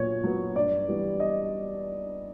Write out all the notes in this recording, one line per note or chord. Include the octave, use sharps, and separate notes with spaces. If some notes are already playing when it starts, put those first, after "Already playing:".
Already playing: A#2 F#3 B3 C#5
F#3 B3
G2 D5
E3 G3 B3
D#5